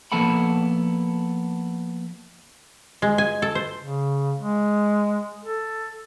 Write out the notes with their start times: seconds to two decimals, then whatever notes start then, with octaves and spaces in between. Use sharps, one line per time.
0.12 F3 A#3 B3 A4 F#5 B5
3.02 G#3
3.18 G#5
3.42 A4
3.55 C5
3.80 C#3
4.39 G#3
5.44 A4